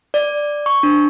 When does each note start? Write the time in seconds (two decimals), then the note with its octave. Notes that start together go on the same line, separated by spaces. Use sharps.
0.14 D5
0.66 C#6
0.83 D4